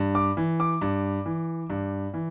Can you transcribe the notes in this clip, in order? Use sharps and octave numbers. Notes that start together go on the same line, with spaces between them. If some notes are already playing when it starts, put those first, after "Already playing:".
Already playing: G2
D6
E3
D6
G2
E3
G2
E3